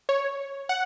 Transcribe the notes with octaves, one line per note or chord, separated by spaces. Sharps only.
C#5
F#5